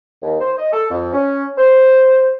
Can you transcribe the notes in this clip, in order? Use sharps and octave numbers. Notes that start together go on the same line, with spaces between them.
D#2
C5
D#5
A4
F2
C#4
C5